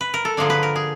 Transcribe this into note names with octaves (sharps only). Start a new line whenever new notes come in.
B4
A#4
A4
D3 F3 A#3 D4 G#4
B4
A#4
G#4